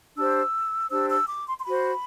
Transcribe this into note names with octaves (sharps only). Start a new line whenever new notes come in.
D4 G4 C5 E6
D4 G4 C5 E6
E6
D6
C6
C6
F#4 C5 B5